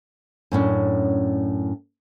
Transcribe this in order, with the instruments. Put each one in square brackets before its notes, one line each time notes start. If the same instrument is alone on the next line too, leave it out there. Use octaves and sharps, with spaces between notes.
[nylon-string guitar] F#2 A2 C#4 D4